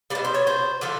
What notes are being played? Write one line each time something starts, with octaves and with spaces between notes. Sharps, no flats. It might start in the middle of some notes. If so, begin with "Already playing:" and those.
G3 D5
B2
C5
C#5
C5
D3 F3 A3 D5